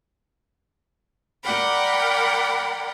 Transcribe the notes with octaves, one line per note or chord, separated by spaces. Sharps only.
A#4 D5 F#5 G5 B5